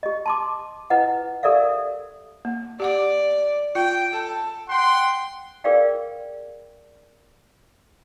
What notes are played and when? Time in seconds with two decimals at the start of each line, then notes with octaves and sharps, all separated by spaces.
0.03 G4 D#5
0.26 A5 C6 D6
0.90 E4 B4 D#5 F#5
1.43 G4 A4 A#4 D5 E5 F5
2.45 A#3
2.80 G4 D5 F#5 D6
3.75 F4 G5
4.13 A4
4.69 F#5 G5 C6
5.64 G#4 A#4 B4 D5 F5 G5